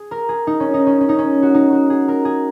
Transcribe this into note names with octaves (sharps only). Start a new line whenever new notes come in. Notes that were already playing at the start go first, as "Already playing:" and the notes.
Already playing: G#4
A#4
G#4
D#4
C#4
D#4
C#4
C#4
D#4
C#4
F#4
D#4
F#4
G#4
A#4
G#4